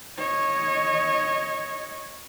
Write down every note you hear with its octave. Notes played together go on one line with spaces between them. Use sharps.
C#5 D#5